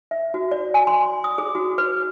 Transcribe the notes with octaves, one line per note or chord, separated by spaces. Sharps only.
E5
F#4
D5
G#5
C6
D#6
G#4
F#4
B4